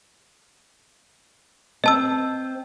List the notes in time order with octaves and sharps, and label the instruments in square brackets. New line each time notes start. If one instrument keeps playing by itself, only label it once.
[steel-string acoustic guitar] C4 [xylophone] D#5 A5 E6